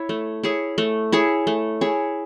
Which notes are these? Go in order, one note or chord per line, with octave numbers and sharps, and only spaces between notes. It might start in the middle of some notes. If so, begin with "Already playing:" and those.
Already playing: E4 C#5
A3
E4 G#4 C#5
A3
E4 G#4 C#5
A3
E4 G#4 C#5